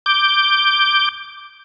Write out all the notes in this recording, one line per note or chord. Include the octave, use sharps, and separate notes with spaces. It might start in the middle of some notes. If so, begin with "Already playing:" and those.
D6 G6